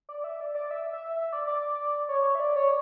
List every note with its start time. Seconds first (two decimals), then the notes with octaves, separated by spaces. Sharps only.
0.09 D5
0.24 E5
0.41 D5
0.55 D5
0.71 E5
0.93 E5
1.16 E5
1.33 D5
1.47 D5
2.09 C#5
2.35 E5
2.39 D5
2.56 C#5